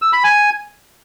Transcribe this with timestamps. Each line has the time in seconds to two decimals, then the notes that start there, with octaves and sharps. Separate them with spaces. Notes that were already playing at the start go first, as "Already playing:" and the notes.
0.02 E6
0.13 B5
0.24 G#5